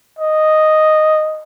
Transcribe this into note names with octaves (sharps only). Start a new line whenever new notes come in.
D#5